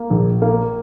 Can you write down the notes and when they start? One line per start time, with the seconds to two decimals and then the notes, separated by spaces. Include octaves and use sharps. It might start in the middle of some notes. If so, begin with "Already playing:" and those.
Already playing: A#3
0.10 A#1
0.42 A#3